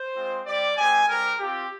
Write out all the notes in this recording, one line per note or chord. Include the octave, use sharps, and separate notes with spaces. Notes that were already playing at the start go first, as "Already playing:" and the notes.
Already playing: C5
G#3 C4 F4
G3 C4 G4 D5
G#3 C4 G4 G#5
G3 C4 G4 A#4
C4 F4 G4